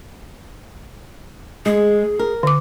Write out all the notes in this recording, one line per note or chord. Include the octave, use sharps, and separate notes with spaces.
G#3 G#4
A#4
D3 D6